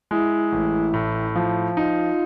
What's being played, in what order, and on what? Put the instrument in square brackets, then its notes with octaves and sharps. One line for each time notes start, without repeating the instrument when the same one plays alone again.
[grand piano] G#3 [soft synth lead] E4
[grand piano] A1
A2
F3
[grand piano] D#4 [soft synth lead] F4